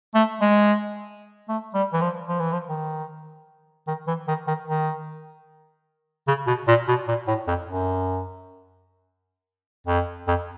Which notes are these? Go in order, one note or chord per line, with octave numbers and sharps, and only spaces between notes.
A3
G#3
A3
G3
E3
F3
F3
E3
F3
D#3
D#3
E3
D#3
D#3
D#3
C#3
B2
A#2
B2
A#2
A2
F2
F#2
F2
F2